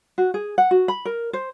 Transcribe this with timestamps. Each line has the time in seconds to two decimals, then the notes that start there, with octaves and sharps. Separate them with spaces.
0.18 F#4
0.34 G#4
0.58 F#5
0.71 F#4
0.88 B5
1.05 A#4
1.33 C5